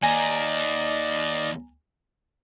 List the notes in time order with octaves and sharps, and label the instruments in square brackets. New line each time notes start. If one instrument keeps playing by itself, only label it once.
[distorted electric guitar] D#2 [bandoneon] D5 D#5 [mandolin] G#5 A#5